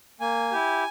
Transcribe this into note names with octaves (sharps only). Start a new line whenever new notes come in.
A#3 G#5
E4 G4